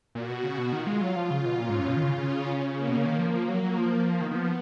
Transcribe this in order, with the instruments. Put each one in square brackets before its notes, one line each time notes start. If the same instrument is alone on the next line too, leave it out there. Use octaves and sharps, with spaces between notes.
[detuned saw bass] A#2 [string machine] F#4
[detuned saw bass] B2
C#3
B2
[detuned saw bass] D#3 [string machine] F4
[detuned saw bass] G#3
F#3
F3
[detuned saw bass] C#3 [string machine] F4
[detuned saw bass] B2
[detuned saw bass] A#2 [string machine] C#4
[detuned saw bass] G#2
F#2
[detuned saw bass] B2 [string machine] F4
[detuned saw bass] D#3
C#3
[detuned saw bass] C#3 [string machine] C#4
[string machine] A#3
[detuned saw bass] B2
C#3
D#3
F3
F3
F#3
F#3
F3
[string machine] A#3
[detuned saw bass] D#3 [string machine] B3
[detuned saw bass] D#3
F3